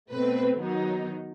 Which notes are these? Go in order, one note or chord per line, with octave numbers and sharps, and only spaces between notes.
B2 A3 C4 B4
D#3 F#3 B3 D#4